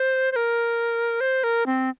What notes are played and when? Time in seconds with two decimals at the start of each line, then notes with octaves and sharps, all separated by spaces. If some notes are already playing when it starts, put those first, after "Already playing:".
Already playing: C5
0.32 C5
0.36 A#4
1.21 C5
1.44 A#4
1.66 C4